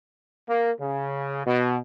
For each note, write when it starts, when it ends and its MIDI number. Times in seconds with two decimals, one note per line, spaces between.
0.48 0.72 58
0.80 1.44 49
1.46 1.78 47